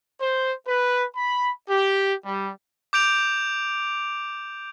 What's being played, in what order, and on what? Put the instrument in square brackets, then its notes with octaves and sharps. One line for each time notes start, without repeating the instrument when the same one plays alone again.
[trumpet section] C5
B4
B5
G4
G3
[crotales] D6 G6 D7 F7